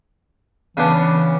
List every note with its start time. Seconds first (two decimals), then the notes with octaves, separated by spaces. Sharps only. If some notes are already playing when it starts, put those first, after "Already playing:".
0.77 C#3 E3 B3 D4